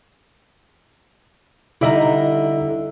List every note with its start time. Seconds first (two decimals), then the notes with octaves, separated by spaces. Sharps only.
1.81 D3 G3 D#4 E4 E5